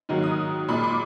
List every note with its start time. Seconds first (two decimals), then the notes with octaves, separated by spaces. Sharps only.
0.09 G#2 D#3 F#3 A#3
0.23 D#6
0.68 A#2 G#3 B5
0.83 D6